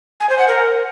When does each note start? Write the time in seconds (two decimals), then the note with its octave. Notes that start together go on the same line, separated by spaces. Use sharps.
0.20 G#5
0.30 C5
0.39 F#5
0.48 A#4